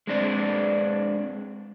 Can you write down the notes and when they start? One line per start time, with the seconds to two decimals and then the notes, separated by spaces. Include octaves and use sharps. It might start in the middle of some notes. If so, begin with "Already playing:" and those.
0.07 G#3 C4 D4 D5